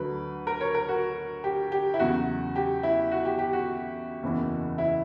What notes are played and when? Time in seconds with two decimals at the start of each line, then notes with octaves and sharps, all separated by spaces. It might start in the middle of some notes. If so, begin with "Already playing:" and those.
Already playing: D2 D3 F#3 B4
0.47 A#4
0.61 C#5
0.74 A#4
0.89 F#4
1.44 G4
1.72 G4
1.94 E4
2.00 E2 C#3 F#3 F#4
2.56 G4
2.83 E4
3.11 F#4
3.25 G4
3.39 G4
3.53 F#4
4.23 F#1 E2 C#3 E3
4.78 E4